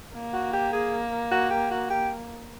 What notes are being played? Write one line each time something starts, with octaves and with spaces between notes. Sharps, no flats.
A#3
F#4
G4
G#4
F#4
G4
F#4
G4